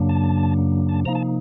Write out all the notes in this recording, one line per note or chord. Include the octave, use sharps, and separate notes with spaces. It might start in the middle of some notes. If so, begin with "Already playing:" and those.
Already playing: F#2 C#3 F#3 A#3 D4
A5
A5
C3 F3 A#3 D#4 A#5
A5